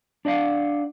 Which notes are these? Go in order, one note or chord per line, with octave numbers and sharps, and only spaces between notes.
D4 D5 D#5 F5 F#5